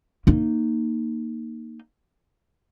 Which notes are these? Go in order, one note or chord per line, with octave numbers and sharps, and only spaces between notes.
A#3 D#4